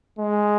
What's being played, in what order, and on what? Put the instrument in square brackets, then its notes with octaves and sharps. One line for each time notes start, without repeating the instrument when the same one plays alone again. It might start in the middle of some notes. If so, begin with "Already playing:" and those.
[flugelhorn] G#3